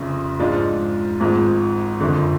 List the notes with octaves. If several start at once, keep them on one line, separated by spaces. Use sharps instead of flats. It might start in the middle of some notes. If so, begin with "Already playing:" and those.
Already playing: F1 F2 C#3
G#2 F3 G#3 D4 F4
G#1 G#2 F3
F#1 F2 D3